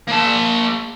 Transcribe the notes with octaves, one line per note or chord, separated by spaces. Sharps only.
A#3 A5